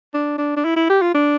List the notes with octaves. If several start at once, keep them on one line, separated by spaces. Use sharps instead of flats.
D4
D4
D4
E4
E4
G4
F4
D4